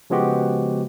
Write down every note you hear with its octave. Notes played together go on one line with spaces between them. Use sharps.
C#3 F3 G#3 B3 F#4 G4